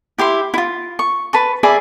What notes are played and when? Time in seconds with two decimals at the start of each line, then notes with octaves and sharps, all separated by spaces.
0.18 E4 G4 E5 C6
0.54 E4 F4
0.99 C#6
1.33 B4 A5 C#6
1.63 G#4 D5 E5 B5